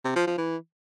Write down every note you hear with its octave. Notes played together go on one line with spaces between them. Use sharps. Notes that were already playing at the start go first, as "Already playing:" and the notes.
C3
F3
F3
E3